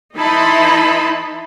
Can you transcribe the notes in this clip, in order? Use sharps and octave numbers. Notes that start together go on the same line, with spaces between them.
E3 D#4 E4 A5 B5 C6